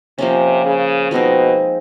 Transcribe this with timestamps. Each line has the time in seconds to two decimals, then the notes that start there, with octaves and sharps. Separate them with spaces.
0.18 C3 F3 A#3 C#4
0.65 C#3
1.11 B2 F3 G#3 C4 D#4